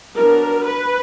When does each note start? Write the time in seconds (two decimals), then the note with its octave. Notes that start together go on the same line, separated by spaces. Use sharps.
0.17 F#3 B3 D4 A#4
0.66 B4